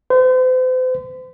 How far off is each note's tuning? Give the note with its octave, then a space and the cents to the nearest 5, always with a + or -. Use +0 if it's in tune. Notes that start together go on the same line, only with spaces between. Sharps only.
C5 -40